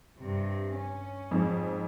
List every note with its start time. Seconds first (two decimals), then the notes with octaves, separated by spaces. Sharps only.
0.18 G2 C3
0.76 C#4
1.31 F2 G#2